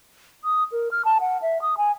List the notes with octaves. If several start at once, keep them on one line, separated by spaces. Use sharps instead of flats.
D#6
A#4
F6
A5
F#5
E5
D#6
G#5